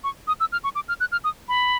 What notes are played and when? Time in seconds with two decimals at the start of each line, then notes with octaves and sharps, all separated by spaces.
0.04 C#6
0.28 D#6
0.40 E6
0.52 F6
0.64 C#6
0.75 D6
0.88 F6
1.00 F#6
1.12 F6
1.24 D#6
1.49 B5